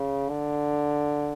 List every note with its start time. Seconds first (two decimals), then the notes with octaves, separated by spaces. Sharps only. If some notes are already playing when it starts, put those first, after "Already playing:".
Already playing: C#3
0.29 D3